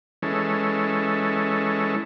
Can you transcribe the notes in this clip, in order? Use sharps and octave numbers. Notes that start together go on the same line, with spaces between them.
E3 G#3 C#4 A4